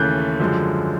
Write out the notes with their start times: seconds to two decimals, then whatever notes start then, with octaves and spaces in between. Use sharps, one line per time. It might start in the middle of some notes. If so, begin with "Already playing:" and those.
Already playing: D#2 C#3 E3 A3 F#6 G6
0.39 F#2 D3 F3 G#3